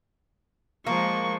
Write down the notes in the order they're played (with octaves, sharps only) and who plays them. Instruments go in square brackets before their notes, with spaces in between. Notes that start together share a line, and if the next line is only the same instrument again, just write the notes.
[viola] F3 G#3 [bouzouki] A#3 [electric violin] C#6